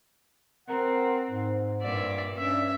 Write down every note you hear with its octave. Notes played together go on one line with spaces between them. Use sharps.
C4 A#4 F#5
G#2
G2 A#2 A#3 D5 E5
G2 C#4 D4 E5